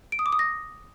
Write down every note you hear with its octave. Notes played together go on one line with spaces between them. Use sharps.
D7
D#6
D6
D#6
A#6